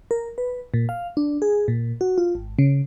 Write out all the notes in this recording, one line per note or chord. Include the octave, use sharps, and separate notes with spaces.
A#4
B4
A#2
F5
D4
G#4
A#2
F#4
F4
G#1
C#3